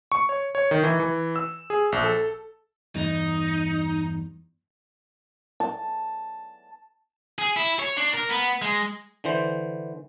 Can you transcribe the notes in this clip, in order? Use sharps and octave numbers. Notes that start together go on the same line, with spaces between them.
C#6
C#5
C#5
D#3
E3
E3
E6
G#4
A#1
A4
E2 G2 D#4
A5
G#4
E4
C#5
D4
A#4
B3
G#3
D3 E3 C5